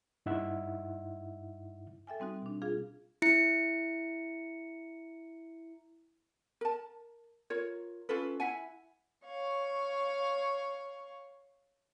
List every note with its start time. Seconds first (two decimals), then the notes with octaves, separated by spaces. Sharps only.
0.26 G2 D#4 E4 E5 F#5
2.07 A4 E5 G5 G#5
2.20 G3 C4 D#4 F#4
2.42 B2 D4
2.62 D4 F4 G#4 F5
3.22 E4 C#7
6.61 A#4 A5
7.50 F4 A#4 C#5
8.09 C#4 F4 A4 B4
8.40 E4 E5 F#5 G#5
9.26 C#5 F5 C#6